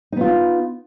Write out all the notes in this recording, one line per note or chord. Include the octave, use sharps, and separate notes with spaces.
B3 D#4 F4